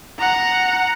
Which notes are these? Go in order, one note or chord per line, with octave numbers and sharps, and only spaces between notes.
F#5 A#5